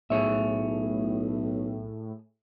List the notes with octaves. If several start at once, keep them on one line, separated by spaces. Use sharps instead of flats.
B1 A2 G#4 C#5 E5